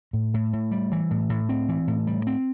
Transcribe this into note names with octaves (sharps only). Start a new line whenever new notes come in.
A2
A2
A2
G3
E3
A2
A2
C4
E3
A2
G3
C4